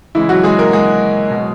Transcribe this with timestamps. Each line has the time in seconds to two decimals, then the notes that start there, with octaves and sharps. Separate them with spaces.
0.15 C#3 E3 G#3 E4
0.29 F#3 F#4
0.43 G#3 G#4
0.58 A#3 A#4
0.73 G#3 G#4
1.31 B2 F#3